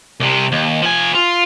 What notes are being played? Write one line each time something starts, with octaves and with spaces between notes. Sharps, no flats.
C2 C3
D#2
F3 G#5
F4